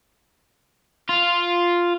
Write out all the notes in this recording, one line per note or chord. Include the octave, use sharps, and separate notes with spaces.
F4